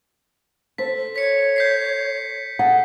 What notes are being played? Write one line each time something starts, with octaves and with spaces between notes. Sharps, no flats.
A4 C5 B6
C#5 B6 C#7
G6 B6 C7
G#4 A4 F#5